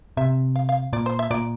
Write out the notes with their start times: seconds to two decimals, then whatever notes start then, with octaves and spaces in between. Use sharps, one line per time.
0.17 C3 E5
0.56 F5
0.69 F5
0.93 A#2 D5
1.06 C5
1.19 E5
1.31 A#2 D5